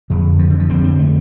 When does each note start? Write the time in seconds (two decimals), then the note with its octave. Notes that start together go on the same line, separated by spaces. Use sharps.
0.10 F2 D3
0.39 F3
0.50 D3
0.59 F3
0.70 F2 C4
0.73 D3
0.84 C4
0.99 A3